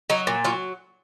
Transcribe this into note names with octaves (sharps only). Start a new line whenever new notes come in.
F#3 D#4
A#2
F#3 F4